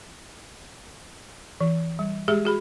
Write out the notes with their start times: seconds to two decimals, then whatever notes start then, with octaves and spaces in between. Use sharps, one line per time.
1.61 E3
1.99 G3
2.28 G#3 G4 G#4 E5
2.45 F#4 G#4 B5